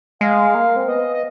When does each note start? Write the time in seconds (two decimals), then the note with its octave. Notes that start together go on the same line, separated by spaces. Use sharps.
0.21 G#3 F5
0.55 A#3
0.76 C4
0.88 B3 D#5
1.13 D#5